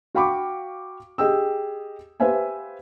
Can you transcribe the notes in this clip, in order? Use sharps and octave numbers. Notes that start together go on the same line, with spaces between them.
F#4 F5 G5 B5 C#6 D6
G4 G#4 D#5 G5 E6
G4 B4 C5 E5 F5 G#5